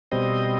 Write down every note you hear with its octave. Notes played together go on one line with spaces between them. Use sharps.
B2 G3 C4 D#5